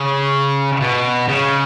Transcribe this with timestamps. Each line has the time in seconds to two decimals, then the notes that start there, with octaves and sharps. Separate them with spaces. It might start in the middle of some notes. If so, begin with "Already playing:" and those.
Already playing: C#3
0.81 B2
1.28 C#3